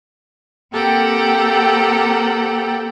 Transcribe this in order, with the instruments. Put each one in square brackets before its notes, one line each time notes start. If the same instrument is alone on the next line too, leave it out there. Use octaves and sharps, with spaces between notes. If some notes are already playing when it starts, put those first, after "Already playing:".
[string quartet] A#3 C4 G4 A4 F#5 G5